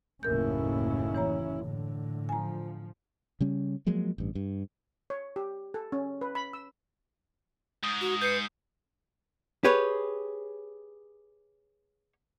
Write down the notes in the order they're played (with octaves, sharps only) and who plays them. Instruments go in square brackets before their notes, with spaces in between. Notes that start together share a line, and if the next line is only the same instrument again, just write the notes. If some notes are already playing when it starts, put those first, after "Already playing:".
[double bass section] F#1 D#2 A2 [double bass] C#4 E4 [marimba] A#4 G6
[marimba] E3 C#5 A#5
[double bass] A2 D3
[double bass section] F3 [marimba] G#5 A#5
[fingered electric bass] C#3 G3 C#4
F3 F#3 G#3 A#3
A1 G2
G2
[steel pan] C#5
G4
A4
C#4
B4
B5
E6
[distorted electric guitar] G#2 [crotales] D#6
[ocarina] F#4
[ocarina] B4 [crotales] G6 C7 C#7
[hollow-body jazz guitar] G4 G#4 B4 C#5